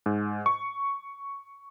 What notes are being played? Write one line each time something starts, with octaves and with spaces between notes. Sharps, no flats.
G#2
C#6